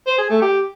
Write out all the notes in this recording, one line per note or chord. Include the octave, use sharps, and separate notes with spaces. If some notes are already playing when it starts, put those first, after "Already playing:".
C5
G#4
A3
G4